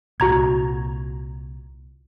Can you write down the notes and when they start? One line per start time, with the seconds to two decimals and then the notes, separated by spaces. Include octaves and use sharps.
0.20 C2 A#2 F#4 A#5 G#6